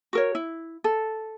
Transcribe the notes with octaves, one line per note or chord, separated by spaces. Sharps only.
F#4 A#4 C#5
E4
A4